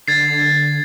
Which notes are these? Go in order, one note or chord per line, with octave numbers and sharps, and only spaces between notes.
D3 G#6 A6 C7